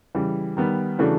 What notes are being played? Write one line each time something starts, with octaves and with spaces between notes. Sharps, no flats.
C#3 E3 G3
D#3 G3 B3
C#3 E3 A3 D4 F#4